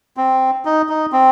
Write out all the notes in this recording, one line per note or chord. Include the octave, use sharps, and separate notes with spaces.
C4
D#4
D#4
C4